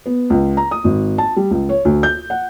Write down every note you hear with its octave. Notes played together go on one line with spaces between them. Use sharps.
B3
C#2
A#5
D#6
G#1
A5
G3
C#2
C#5
D2
G6
F#5